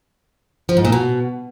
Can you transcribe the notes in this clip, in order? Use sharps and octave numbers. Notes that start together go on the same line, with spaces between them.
F3
G#2
A#2
B2